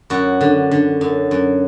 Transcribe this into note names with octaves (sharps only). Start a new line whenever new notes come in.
F#2 F#4
D3
D3
F#2
F#2